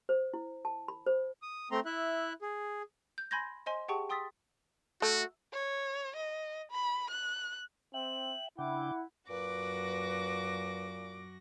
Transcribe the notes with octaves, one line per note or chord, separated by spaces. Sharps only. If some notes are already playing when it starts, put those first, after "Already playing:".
C5
E4
A5
B5
C5
D#6
A3 C4 A#5 C6
E4 E5 F#6
G#4
G6
G#5 B5 C6 G6 G#6 A#6
C5 D#5 G#5 C6
G4 G#4 F#5 G5 A5 C#6
G5 C6 D#6 E6 A6 B6
A3 F#4
C#5
D#5
B5
F#6
C4 E5 G5 F#7
C#3 D4 E4 F#5 G5 D6
F#2 A#2 F#4 B4 D6 A#6